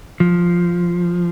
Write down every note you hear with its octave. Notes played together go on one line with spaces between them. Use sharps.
F3